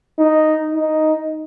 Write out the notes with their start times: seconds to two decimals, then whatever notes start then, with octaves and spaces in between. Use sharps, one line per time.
0.19 D#4
0.75 D#4